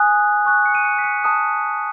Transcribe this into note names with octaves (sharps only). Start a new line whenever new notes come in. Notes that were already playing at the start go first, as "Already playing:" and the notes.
Already playing: G#5 D#6 F#6
G#5 C#6 F#6
C#7
D#7
C#7
B6
C#7
A5 D#6 F#6